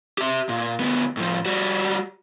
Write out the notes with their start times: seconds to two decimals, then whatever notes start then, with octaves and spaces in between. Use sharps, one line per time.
0.18 G4 E5
0.49 A#2
0.80 D2 B3
1.17 A2 F3
1.46 G3 F#4